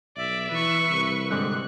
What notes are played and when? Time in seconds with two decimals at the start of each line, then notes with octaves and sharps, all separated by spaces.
0.17 B1 D5 E5
0.51 E3 B4 C#6
0.89 C2
1.30 G#2 D3 C4 F#6